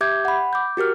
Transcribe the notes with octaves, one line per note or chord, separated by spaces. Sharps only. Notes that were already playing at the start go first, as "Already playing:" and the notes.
G4 E5 D6 G6 G#6
F#5 B5
D6 G6
F#4 G4 A#4 F6